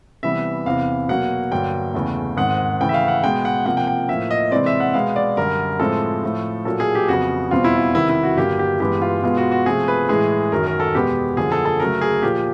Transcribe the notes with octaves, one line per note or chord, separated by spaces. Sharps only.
C3 E3 G3 B3 E5
E2 C3 E3 F5
B2 F#3 A#3 F#5
G2 D3 F#3 A#3 G5
E2 C#3 E3 A3
G#2 D#3 G#3 C4 F#5
C#3 E3 A3 G5
E5
F5
F#5
B2 G#3 B3 G5
F#5
C3 F3 A#3 F#5
G5
G5
A2 F3 A#3 E5
D#5
C3 E3 G#3 C4 D5
E5
F#5
B2 G#3 B3 F5
D5
F#2 D3 G3 A#4
A2 F3 G#3 C4 A4
A2 F3 A3
A#2 F#3 A#3 A4
G#4
G4
F2 C#3 F#3 B3 F#4
E2 B2 G3 C4 F4
E4
F4
C3 D#3 G3 B3 E4
E4
F#4
G2 D3 F#3 A#3 G4
G4
G2 E3 G#3 B3 G4
F4
B2 G#3 B3 F4
F#4
F#4
C3 F3 A3 G#4
B4
A2 E3 G#3 G#4
F#2 D#3 F#3 A#4
A#4
A4
E2 B2 G#3 B3 G4
F#2 D3 F3 A#3 G#4
A4
A4
C#3 F#3 A3 A#4
G#4
A#2 F3 A#3 G4